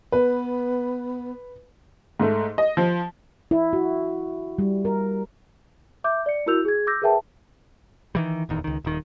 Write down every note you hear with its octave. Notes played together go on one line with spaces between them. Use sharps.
B3 B4
G#2 A3
D#5
F3
E4
F#4
G3
A#4
E5 D6 G6
D5 C#7
E4 F#4 A#4 E6 G6 F7
G#4 G#6
D6 E6 G6 A#6
G#4 A#4 B4 E5 G5 A5
D#3 E3 G3
D#1 E2 D#3
C#2 D#3
D#1 D#3